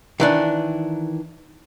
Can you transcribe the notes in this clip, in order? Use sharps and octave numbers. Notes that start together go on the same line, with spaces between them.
D#3 E3 D4